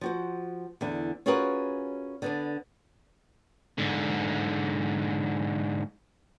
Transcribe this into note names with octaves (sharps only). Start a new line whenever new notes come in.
F3 F#4 C5
E2 D3
C#4 F4 F#4 G#4 A#4 B4
D3 B3 D4
G#2 D3